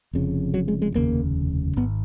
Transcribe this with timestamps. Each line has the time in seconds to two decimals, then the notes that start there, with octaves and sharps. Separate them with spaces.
0.13 F1 F2 C#3
0.54 F#3
0.68 G#3
0.82 G#3
0.95 F1 D#2 C#3 A#3
1.76 G#1 G#2 B3